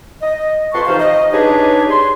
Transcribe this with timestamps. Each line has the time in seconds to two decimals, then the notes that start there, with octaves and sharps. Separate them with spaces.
0.21 D#5
0.73 F2 B4 A5 C6 C#6
0.87 C3 E3 D#4 C5 F5
1.00 D#5
1.32 D4 D#4 G4 G#4 B4 C#5
1.90 C6